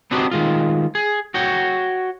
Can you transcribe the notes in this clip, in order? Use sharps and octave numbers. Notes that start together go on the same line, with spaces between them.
B3 C4 D4 D#4 F#4 G4
D#3 G#3 F4
G#4
F#4 C#5 G5